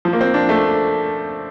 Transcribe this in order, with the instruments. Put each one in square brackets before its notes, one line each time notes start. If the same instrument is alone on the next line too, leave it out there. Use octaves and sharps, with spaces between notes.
[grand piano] F3
A#3
C4
D4
A3